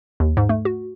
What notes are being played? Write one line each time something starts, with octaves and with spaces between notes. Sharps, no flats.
D#2
G#2
A3
F#4